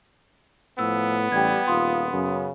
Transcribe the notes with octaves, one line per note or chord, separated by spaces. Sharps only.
A2 F3 B3 E6
A1 G3 G5 G#6
D#1 F4 C6 D#6
F#2 C#3